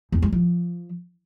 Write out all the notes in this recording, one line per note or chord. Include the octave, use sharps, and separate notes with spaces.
E2
G#3
F3